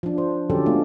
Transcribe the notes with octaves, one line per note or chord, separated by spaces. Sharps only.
F3 D4
C5
D3 F3 F#3 C#4 G4 A4
G#3 A3 B3 F4